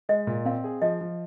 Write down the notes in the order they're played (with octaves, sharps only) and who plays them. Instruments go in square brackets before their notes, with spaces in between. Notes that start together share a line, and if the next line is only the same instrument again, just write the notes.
[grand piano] G#3 [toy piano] D#5
[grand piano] A#2
[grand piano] C4 [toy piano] F5
[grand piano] G#4
[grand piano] F3 [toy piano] D#5
[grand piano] F3